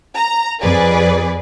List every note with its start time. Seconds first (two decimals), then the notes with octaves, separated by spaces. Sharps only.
0.16 A#5
0.62 F2 G#4 B4 D5